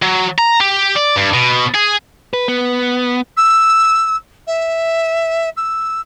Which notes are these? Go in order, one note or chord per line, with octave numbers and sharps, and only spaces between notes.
F#3
A#5
G4
D5
G2
B2
G#4
B4
B3
E6
E5
E6